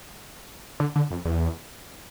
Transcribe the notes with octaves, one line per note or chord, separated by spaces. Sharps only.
D3
D3
F2
E2